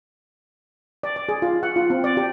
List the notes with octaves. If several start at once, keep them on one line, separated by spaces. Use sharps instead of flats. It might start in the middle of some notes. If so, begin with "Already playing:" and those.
D5
D5
G#4
F4
F#5
F4
C4
D5
G4